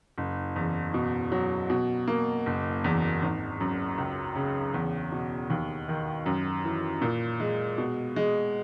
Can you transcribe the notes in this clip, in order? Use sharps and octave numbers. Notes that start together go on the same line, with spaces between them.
F#1
E2
B2
F#3
B2
A#3
F#1
E2
G#1
F#2
C#2
C#3
E2
B2
D#2
D#3
F#2
E3
A#2
G#3
B2
G#3